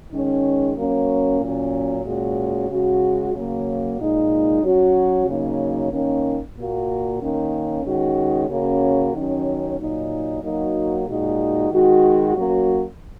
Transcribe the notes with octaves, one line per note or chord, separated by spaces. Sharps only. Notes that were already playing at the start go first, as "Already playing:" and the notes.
D#3 G#3 C#4
F#3 A#3 C#4
A#2 F#3 C#4
A#2 G#3 C#4 F#4
C#3 G#3 F#4
C#3 F#3 A#3 F#4
A#2 G#3 D#4
F#3 C#4 F#4
C#3 F#3 A#3 D#4
D#3 A#3 C#4
A#2 A#3 F#4
D#3 A#3 C#4
D#3 G#3 C#4 F#4
C#3 A#3 C#4 F#4
D#3 F#3 C#4
A#2 F#3 D#4
F#3 A#3 D#4 F#4
A#2 G#3 D#4 F#4
D#3 G#3 F#4
F#3 A#3 C#4 F#4